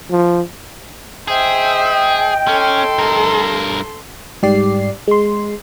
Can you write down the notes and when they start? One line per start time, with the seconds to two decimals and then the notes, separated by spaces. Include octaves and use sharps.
0.10 F3
1.28 G#4 C5 D#5 E5 G5
2.48 C#4 A4 C6
2.99 G2 A#4
4.43 G#2 G3 G4 D5 C7
5.07 G#3 C6